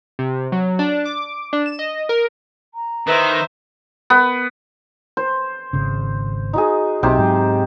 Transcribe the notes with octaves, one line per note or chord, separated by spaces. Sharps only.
C3
F#3
D4
D6
D4
E7
D#5
A#4
A#5
D#3 D#4 E4 B4 C5 E5
B3
C5
G#1 C#3
D#4 F#4 G#4
B1 C3 D#4 G4 C5
G#2 F#3